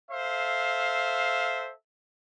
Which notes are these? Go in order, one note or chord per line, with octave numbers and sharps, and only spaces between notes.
A4 C5 E5 F5